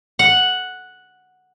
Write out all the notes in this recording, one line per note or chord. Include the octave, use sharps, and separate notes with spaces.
F#5